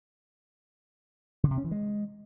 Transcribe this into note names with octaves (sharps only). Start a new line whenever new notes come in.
D3
C3
C#4
E3
G#3